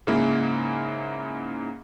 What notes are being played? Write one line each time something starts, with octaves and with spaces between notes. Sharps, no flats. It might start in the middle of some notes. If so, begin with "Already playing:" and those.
G#2 C#3 G#3 A#3 E4